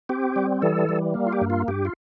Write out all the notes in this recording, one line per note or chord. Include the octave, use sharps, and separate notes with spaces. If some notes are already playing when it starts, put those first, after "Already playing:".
C4 G4
G3
E3 A4
G3
A#3
F4
G4
G2
F4
G2 G4
F4